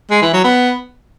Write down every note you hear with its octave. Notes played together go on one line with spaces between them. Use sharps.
G#3
E3
F#3
B3